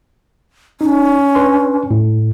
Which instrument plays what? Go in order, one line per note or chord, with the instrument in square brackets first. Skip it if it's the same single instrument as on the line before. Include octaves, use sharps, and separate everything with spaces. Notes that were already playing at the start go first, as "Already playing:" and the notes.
[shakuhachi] C#4 [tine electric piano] D#4
[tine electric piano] D4 B4 C6
A2